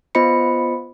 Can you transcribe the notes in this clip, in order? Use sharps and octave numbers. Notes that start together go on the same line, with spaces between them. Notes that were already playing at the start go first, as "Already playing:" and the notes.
B3 F4 C5 D#5 B5 C#7